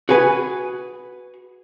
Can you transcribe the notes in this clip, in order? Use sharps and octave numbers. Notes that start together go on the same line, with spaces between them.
F#4 G#4 B4 G#5